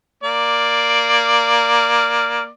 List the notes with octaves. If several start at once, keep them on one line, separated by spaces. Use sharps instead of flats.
A#3 D5